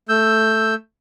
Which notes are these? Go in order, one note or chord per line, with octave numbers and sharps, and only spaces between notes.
A3 E6 G6